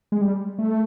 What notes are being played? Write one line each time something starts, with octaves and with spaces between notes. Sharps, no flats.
G#3
G3
A3